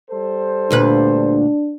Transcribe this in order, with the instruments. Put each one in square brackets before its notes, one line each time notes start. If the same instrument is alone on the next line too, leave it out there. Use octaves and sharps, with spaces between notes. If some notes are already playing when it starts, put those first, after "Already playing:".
[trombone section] G3 A4 C5
[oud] D2 A#2 B4 [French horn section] D4